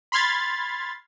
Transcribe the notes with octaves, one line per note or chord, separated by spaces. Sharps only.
B5 C6 F6 G#6 A6